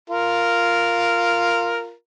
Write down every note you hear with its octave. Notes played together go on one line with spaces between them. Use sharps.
F4 A#4